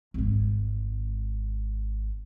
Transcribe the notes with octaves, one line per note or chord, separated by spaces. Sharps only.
G#1 G#3